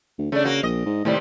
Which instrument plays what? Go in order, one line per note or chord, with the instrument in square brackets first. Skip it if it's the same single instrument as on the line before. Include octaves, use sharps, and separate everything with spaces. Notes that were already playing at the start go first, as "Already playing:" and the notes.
[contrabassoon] D2
[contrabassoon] C#3 [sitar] A3 D4
[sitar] A#3 F#4
[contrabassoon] A#1 [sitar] D#5
[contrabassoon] G#2
[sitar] D#2 C3 G3 [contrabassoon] A2